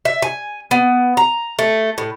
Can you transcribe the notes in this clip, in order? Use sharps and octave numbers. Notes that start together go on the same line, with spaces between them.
E5
G#5
B3
A#5
A3
A2